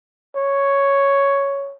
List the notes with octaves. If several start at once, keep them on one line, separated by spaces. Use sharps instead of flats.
C#5